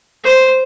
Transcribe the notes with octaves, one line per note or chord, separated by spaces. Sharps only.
C5